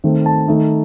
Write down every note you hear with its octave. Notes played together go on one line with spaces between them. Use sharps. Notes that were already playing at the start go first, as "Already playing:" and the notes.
D#3 A3 C4
A5
D#3 A3 D#4